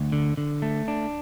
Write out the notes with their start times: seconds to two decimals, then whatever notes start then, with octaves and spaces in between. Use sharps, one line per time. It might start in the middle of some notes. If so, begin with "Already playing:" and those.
Already playing: D2
0.12 D3
0.37 D3
0.62 A3
0.88 D4